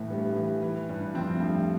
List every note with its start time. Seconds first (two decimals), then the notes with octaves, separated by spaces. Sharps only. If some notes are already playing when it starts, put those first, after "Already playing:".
Already playing: A2 E3 A3
0.10 G2 G3 B3
0.36 E3
0.62 E3
0.89 G2
1.14 F2 F3 C4
1.35 A3
1.40 G2 F3 G3